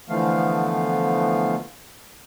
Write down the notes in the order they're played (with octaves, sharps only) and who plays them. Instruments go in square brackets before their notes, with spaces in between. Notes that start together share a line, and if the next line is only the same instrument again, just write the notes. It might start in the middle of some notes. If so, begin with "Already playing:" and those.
[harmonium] D3 E3 F3 A3 B3 F5